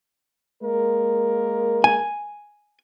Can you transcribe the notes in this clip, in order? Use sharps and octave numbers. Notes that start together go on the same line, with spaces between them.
G#3 A#3 A#4
G#5